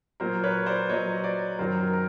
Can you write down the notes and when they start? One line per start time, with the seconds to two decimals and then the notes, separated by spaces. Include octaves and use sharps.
0.20 A#2 F#3 A#4 C5
0.43 B4 C#5
0.66 C5 D5
0.90 A#2 F#3 C#5 D#5
1.24 C5 D5
1.59 F#2 D#3 F#3 A#4 C5
1.93 A#4